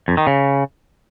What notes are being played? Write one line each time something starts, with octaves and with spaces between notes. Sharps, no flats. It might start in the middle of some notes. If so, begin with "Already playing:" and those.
F2
D#3
C#3